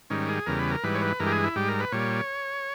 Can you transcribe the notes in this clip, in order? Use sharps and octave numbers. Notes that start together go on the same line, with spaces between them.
G#2 D#3 G3 C#4
G#4
E2 C#3 G3 A#4
B4
A#4
G#2 E3 G3 B4
C#5
B4
G2 E3 G#3 A#4
G4
G#4
E4
G#2 G3 G4
A#4
B4
A#2 G3 C#5